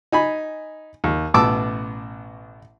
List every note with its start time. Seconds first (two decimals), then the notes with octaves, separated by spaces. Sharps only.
0.12 D#4 G#5 B5
1.04 D#2
1.34 A1 B2 A5 D6 E6